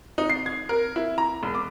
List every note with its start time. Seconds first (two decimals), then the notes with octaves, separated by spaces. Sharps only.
0.18 D#4
0.30 C7
0.46 G#6
0.69 A#4
0.96 E4
1.18 A#5
1.43 E1
1.55 D6